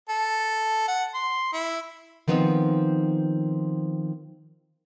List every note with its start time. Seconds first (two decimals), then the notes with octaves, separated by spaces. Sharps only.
0.09 A4
0.88 F#5
1.14 C6
1.53 E4
2.28 D#3 F3 B3 C4 D4 D#4